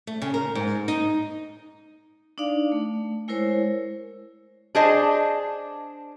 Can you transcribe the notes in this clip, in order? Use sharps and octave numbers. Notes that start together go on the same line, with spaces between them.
A3
C#3
A#4
G#2
D#4
D4 D#4 D5 F5
A3
G#3 E4 A#4 C5 C#5
D4 G#4 C5 D#5 A5